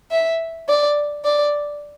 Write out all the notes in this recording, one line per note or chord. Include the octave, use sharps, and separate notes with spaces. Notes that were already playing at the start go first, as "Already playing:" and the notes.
E5
D5
D5